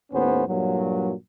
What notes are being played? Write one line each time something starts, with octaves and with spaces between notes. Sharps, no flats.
D#2 A2 B3 C#4 C5
G2 A#2 F#3